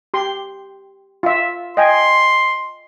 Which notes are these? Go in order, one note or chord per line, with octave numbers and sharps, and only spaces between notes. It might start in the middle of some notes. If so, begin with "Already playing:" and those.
G4 C6
F4 E5
D#5 G5 G#5 C6